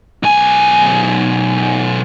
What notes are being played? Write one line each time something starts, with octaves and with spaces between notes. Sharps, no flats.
B1 G#5